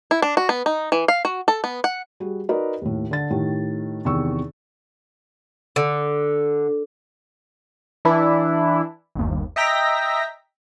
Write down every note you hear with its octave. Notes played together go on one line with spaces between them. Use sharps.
E4
D4
F#4
B3
D#4
E3
F5
F#4
A4
B3
F#5
G3 F#4 G#4
D#4 F#4 A#4 B4 D5 D#5
D#2 A2
D3 A6
A2 D#3 G4
E2 C3 D#3 C#6 E6
D3
E3 D4 E4
G1 D#2
D#5 E5 G5 A#5 A#6 B6